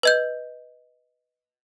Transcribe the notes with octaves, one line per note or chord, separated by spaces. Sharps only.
B4 D#5 G6